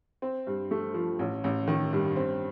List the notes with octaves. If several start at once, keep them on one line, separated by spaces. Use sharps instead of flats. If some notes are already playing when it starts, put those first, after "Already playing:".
C4
G2
A3
F3
A1
A1
D#3
G2
C4